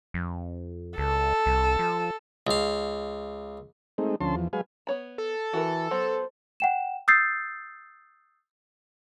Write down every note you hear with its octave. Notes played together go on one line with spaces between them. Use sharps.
F2
C#2 A4
C2
F3
C#2 F5
G#3 A3 C4 D#4
D2 F3 C#4 A5 C6
E2 F3
F#3 G#3 B4 F5 G#5
B3 C#5 B5
A4
E3 F#4 A#4
F#3 B3 C5
F#5 G5 E7
D#6 E6 G6 A6 C7